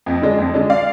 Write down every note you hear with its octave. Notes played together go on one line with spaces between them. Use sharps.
F2
D3 G#3 D4
F2
D3 G#3 D4
D5 F5